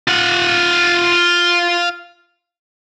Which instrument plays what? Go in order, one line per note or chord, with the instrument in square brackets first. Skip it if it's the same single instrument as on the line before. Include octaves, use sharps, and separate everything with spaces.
[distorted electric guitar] F4 F#5